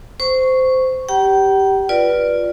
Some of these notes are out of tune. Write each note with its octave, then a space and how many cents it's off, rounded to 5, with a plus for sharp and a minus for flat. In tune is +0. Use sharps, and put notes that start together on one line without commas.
C5 -15 C#6 +0
G4 +0 G5 -45 A#5 +45
F4 +0 B4 -15 D5 +0